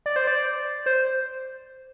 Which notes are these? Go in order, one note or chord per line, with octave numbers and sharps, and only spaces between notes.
D5
C5
D5
C5